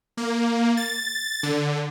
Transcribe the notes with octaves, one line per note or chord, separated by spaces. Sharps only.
A#3
A6
D3